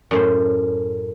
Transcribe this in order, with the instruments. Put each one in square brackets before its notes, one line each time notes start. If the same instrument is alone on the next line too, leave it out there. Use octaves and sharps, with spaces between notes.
[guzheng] F#2 A2 C5